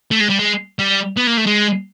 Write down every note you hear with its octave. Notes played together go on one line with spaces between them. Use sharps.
A3
G#3
G3
G#3
G3
B3
A#3
A3
G#3